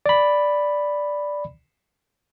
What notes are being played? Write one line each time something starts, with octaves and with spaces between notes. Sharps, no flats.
D5 B5